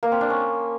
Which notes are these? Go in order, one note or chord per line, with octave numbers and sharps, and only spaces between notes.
A#3
C4
D4
C#4